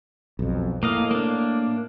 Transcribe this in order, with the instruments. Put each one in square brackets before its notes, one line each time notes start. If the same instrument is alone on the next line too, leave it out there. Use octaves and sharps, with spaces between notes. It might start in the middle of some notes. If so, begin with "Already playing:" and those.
[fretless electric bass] B1 F2
[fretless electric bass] A2 [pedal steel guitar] A#3 D#5 F5
[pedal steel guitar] A#3 D4